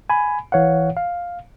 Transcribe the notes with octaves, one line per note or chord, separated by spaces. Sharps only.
G#5 B5
G#1 E3 C#5 F5 F#5
F5